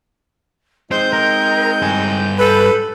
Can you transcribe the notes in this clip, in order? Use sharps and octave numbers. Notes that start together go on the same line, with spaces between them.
G#3 C4 D#4 C5 G6
A#4
G2 G#5
A4 B4